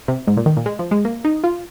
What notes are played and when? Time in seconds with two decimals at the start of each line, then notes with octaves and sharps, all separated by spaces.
0.08 C3
0.27 G#2
0.37 A#2
0.46 D#3
0.57 A#2
0.66 G#3
0.79 F3
0.91 G#3
1.05 A#3
1.24 D#4
1.44 F4